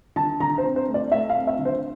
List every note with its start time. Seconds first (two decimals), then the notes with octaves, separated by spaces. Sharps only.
0.16 D3 A5
0.40 D3 A#5
0.58 C5
0.64 C4
0.76 C5
0.88 A3
0.94 D5
1.11 A3 E5
1.30 F5
1.36 C4
1.47 E5
1.59 D3
1.65 C5